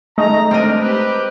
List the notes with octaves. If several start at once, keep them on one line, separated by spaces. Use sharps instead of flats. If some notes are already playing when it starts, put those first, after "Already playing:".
G#3 A3 D#4 A#5
C4 D4 A#4 D#5
G4 B4